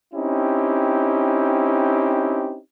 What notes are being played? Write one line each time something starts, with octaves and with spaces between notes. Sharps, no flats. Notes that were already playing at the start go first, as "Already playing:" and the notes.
C4 C#4 D#4 E4 G4